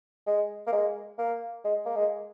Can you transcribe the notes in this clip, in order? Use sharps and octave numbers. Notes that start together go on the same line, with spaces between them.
G#3
A#3
G#3
A#3
G#3
A#3
G#3